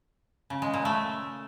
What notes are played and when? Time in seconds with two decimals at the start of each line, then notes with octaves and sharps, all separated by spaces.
0.50 C#3
0.62 G#3
0.74 A#2
0.85 A3